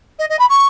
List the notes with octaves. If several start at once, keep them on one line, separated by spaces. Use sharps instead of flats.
D#5
D#5
B5
C#6